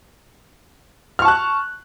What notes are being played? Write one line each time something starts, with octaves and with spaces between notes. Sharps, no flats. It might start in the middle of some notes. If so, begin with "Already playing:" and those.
A5 C#6 F6 F#6